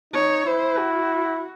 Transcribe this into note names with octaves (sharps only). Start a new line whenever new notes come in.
D#4 C#5
E4 C5
F#4